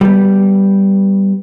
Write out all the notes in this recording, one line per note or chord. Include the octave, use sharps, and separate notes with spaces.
G3 B3